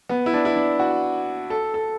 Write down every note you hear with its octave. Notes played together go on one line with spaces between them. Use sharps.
B3
E4
D4
E4
D4
F#4
A4
A4